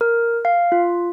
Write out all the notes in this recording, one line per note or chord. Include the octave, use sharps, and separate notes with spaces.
A#4
F5
F4